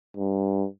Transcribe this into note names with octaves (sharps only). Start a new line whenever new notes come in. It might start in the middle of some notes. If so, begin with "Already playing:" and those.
G2